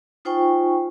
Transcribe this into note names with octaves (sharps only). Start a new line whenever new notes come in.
D#4 F4 C5 G5 G#5 C#6